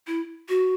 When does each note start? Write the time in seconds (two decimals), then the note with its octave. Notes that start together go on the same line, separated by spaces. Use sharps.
0.07 E4
0.49 F#4